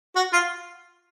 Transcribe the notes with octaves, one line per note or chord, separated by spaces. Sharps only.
F#4
F4